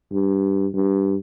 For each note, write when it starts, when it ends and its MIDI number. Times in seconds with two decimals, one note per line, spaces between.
0.13 0.67 43
0.74 1.16 43